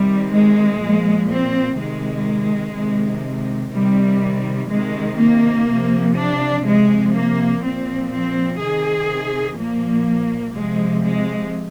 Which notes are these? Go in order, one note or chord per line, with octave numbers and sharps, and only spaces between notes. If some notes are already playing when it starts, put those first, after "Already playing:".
Already playing: C3 D#3 G3
G#3
A#2 F3
C4
C3 D#3 G#3
C3 D#3
C3 D#3 G3
C3 D#3 G#3
A#3
C3 F3
D4
C3 F3 G#3
A#3
A#2 F3 C4
C4
C3 D#3 G#4
A#2 F3 A#3
C3 F3 G#3
G#3